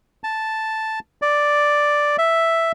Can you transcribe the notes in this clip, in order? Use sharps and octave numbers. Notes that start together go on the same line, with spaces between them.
A5
D5
E5